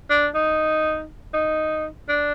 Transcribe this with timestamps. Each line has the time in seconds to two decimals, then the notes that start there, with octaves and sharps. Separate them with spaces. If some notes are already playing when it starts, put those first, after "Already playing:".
0.10 D4
0.35 D#4
1.34 D#4
2.08 D4